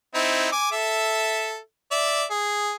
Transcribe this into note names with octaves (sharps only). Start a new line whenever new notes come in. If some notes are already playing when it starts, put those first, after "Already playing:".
C4 D#4 E4
G#5 D6
A4 E5
D5 E5
G#4